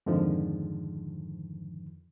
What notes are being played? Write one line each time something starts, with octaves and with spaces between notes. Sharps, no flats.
F2 G#2 D3 D#3 F3